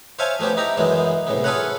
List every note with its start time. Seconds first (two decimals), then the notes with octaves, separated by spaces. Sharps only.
0.19 C5 C#5 E5 F5 G#5 A5
0.39 F3 A3 B3 C#4 G4
0.57 D#4 E4 G4 A#5
0.77 C#2 F#2 E3 G#3 B3
1.27 C2 A2 C#3 B3
1.44 F4 G#4 A4 B4 C#5 F#5